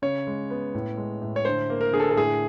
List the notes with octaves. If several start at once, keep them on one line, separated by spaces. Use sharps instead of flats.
C#3 C#5
G#3
B3
A2
G#3
A2
C#5
D3 C5
A#3
A#4
D3 G#4
A4
A4
A2 G#4